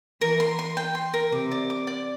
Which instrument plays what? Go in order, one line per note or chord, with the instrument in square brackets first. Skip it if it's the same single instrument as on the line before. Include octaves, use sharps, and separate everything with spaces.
[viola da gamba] E3 [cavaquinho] A#4
[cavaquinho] C6
C6
G5
C6
A#4
[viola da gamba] C3 [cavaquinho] D6
[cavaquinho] D5
D6
D5